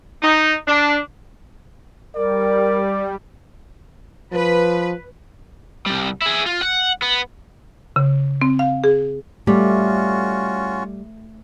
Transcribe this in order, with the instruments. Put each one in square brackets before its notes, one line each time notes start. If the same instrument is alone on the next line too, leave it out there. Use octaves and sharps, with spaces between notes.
[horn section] D#4
D4
[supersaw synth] G3 [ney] A#4 [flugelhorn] D5
[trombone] F3 [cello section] B4
[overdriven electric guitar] C2 G3
E4 G#4
F4
F#5
B3
[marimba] C#3
C4
F5
G#4
[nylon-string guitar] G3 [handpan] A3 [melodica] C#4 F4 F#4